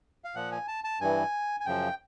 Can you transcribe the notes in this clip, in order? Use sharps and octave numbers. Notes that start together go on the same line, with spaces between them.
F5
A#2 F3 F#5
G#5
A5
A5
G2 E3 G#5
G#5
F#2 C#3 F3 G5